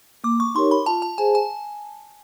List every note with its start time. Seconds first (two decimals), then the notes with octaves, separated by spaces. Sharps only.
0.24 A#3 D6
0.40 C#6
0.55 D#4 G4 A#4 C#5 C6
0.71 B5
0.86 F4 A5
1.02 A5
1.18 G#4 C5 F5 G#5
1.35 G#5